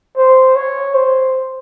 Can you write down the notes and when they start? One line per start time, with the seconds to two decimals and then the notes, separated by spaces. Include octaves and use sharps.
0.17 C5
0.56 C#5
0.94 C5